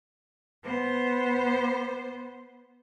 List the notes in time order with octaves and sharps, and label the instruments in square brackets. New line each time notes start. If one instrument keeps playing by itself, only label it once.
[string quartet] B3 C5